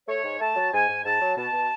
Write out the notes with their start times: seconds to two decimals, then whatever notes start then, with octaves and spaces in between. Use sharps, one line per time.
0.08 A3 C#5
0.24 G#2
0.40 A3 A5
0.56 F#3
0.73 G#2 G#5
0.89 G#2
1.05 G#2 A5
1.22 F#3
1.37 B2 A5
1.53 B2